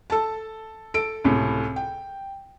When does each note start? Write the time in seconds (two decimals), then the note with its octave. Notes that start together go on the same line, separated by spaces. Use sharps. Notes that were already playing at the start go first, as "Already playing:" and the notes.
0.10 A4 A5
0.94 A4 D7
1.24 C#2 A2 C3
1.76 G5